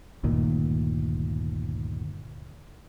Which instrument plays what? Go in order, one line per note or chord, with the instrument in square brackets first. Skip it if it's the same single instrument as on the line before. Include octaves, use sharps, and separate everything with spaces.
[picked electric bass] G1 D2 A#2 D#3